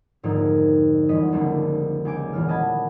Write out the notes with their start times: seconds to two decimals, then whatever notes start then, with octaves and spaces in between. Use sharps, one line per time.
0.23 F2 G#2 D3 A#3 D#4
1.09 G1 E2 D#5 B6
1.32 F1 C#2 D3 A#3 D4
2.05 C#2 G#5 D6 G6
2.33 D#1 E2 F6
2.49 D#5 F#5 A5 B5 G#6